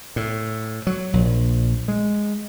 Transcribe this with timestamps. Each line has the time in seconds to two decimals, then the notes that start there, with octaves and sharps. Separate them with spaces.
0.16 A2
0.87 F#3
1.13 A#1
1.88 G#3